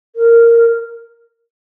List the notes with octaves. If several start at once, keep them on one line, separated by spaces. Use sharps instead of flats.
A#4